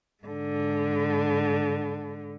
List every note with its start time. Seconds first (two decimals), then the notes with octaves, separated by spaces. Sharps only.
0.24 G#2 D3